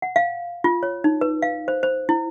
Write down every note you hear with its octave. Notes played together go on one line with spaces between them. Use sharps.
F#5
F5
F4
C#5
D#4
B4
F5
C5
C5
E4